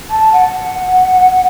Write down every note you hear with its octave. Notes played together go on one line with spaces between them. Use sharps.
A5
F#5